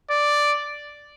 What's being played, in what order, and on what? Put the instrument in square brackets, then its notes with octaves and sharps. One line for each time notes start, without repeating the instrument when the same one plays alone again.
[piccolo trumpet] D5